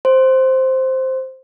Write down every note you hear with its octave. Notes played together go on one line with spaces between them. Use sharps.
C5